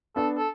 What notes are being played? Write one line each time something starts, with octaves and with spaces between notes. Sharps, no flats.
B3 D4 A4
A4